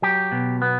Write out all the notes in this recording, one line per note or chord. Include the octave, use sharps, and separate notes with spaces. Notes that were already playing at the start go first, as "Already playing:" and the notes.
F#3 G4
B2
B3